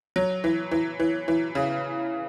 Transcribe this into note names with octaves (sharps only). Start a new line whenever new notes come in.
F#3
E3
E3
E3
E3
C#3